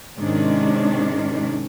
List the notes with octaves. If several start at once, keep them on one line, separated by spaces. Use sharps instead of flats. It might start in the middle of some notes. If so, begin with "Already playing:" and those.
G#2 C3 D#3 G#3 C#4 D4